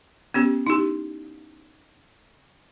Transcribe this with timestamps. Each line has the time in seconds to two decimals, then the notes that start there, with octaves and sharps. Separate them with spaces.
0.34 B3 C#4 G4
0.67 D#4 E4 G4